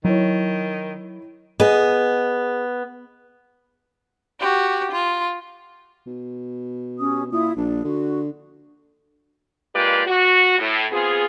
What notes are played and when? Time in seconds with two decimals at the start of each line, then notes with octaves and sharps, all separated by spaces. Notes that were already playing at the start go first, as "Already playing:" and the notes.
0.05 D#3 F#3 E4 C#5
1.60 B3 G#4 D#5
4.40 F#4 G4
4.92 F4
6.06 B2
6.99 C#4 G4 D#6
7.32 A#2 E4 F4 D#6
7.56 A#1 D4
7.84 D3 F#4
9.75 G#3 A#3 F4 G4 B4 D5
10.07 F#4
10.59 A2
10.92 B3 C4 F4 G#4